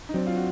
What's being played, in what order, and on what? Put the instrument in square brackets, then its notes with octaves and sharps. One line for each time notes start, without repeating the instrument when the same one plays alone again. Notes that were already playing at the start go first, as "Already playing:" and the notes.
[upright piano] D#4
[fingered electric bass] F#3 [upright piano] C4 D4
[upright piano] F4
F#4